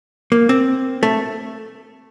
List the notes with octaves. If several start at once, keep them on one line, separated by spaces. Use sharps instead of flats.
A#3
C4
A3